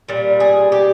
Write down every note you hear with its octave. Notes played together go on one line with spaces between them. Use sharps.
A#2 G3 A#4
G#4
G4